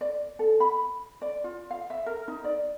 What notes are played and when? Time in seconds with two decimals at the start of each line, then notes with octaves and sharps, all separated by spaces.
0.01 D5
0.39 A4
0.60 B5
1.22 D5
1.44 F4
1.70 F5
1.90 E5
2.06 A#4
2.28 D#4
2.44 D5